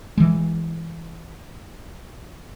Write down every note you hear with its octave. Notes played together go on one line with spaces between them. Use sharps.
E3 G#3